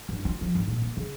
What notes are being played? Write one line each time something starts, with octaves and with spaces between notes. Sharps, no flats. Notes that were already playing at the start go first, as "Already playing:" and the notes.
G2
F4
F3
G#1
A#2
A#3
C#3